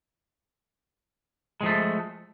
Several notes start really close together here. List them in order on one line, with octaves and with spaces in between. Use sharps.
G#3 F3 A3